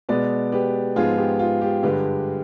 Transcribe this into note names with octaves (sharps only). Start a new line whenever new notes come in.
B2 G#3 B3 B4 D5
G4 B4
G#2 F3 G#3 B3 F4 G#4
G4
F4
G4
G2 D3 G#3 G4 B4